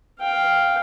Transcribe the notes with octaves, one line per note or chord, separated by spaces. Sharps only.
F5 G5